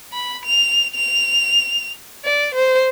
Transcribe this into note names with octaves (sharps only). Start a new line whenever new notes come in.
B5
F7
F7
D5
C5